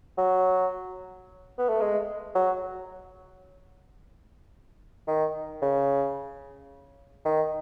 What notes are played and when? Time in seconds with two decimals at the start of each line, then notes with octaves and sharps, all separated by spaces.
0.18 F#3
1.58 B3
1.69 A3
1.81 G#3
2.35 F#3
5.07 D#3
5.62 C#3
7.25 D#3